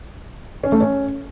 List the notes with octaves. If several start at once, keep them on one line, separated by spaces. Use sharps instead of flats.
C#4
A3
C#4